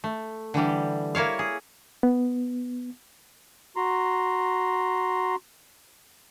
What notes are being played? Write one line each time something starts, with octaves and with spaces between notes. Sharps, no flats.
A3
D3 E3 G3 G4
A#3 E4 C#5 F5
G#4
B3
F#4 A#5 C6